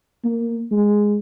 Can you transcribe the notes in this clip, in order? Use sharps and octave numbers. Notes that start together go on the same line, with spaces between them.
A#3
G#3